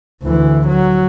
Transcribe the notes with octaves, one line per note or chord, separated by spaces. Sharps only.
D2 E3
F#3